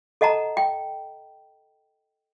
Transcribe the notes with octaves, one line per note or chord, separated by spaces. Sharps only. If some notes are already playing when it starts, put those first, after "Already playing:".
A4 D#5 F#5 A5 A#5
G5